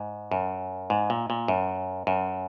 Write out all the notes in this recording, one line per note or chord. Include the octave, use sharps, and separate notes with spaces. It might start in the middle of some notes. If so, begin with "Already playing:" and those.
Already playing: G#2
F#2
G#2
A#2
A#2
F#2
F#2